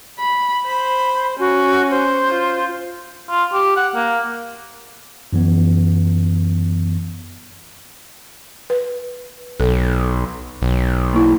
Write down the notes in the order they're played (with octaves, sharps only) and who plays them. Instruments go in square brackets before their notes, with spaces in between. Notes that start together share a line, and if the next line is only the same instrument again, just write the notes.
[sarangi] B5
[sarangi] C5 [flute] B5
[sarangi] C#4 [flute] F#4
[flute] C5
[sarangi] F4
[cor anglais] F4
G4
F#5
A#3
[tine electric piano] F#2 E3 B3
[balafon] B4
[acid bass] B1 [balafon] A4
[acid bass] B1
[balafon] A#3 E4